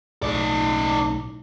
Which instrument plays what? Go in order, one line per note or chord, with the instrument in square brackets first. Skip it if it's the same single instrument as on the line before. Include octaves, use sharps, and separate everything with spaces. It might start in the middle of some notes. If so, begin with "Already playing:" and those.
[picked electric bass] B1 A2 [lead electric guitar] D#4 D5